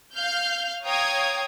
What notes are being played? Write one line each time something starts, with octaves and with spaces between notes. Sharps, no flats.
F5 F6 G6
C#5 F5 G5 A#5 D#6 G#6